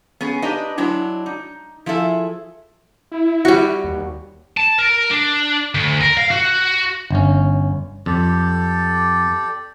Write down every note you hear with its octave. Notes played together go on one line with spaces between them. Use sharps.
B3 C#4 G#4
D4 D#4 G4 B4 D#5
F#3 G#3 D4 E4
D#4
F3 E4 G#4 A4 E5
E4
G3 F#4
D#2
A5
A#4
D4
D2
A#4
F5
F#4
G1 C#4
F2 G4 A4 D5